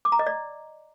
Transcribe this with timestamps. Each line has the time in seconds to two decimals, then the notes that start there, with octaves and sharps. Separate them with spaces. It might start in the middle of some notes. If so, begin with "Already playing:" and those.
0.05 D6
0.12 A#5
0.19 D#5
0.27 D5